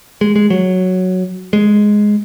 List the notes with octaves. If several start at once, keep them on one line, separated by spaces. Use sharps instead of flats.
G#3
G#3
F#3
G#3